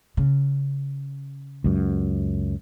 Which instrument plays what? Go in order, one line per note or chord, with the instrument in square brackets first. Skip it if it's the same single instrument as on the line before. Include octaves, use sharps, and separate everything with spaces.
[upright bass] C#3
[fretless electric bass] C#2 F#2